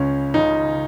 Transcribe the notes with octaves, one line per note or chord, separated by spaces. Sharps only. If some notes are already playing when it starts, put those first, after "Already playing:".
Already playing: C#2 C#3 C#4
C#2 C#3 D#4